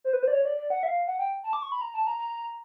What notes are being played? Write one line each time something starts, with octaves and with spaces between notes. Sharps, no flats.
C5
B4
C5
D5
C#5
D5
D5
F#5
E5
F5
F#5
G5
A5
D6
C#6
B5
A#5
A5
A#5
A#5